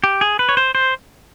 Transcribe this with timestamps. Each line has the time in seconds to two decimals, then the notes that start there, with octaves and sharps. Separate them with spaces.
0.04 G4
0.21 G#4
0.39 B4
0.49 C#5
0.57 C5
0.75 C5